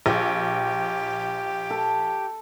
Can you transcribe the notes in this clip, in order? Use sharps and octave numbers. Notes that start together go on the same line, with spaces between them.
A#1 G4
A4